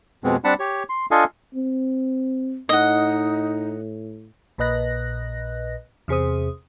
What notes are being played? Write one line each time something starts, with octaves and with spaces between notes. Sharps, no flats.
F2 B2 G#3 B3 C4
G3 C4 D4 F#5 A5 B5
G4 C#5
C6
D4 F4 A4 D#5 F5 G#5
C4
A2 D#4 D#5 F#5
A#1 A#2 B4 D#5 F#6 A#6
E2 C3 G#4 C5 D#6